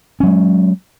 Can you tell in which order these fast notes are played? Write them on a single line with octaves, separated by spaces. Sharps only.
C#4 F#3 G#3